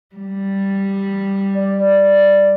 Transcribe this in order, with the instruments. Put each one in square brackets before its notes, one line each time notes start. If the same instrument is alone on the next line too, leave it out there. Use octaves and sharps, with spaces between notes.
[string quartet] G3
[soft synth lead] D5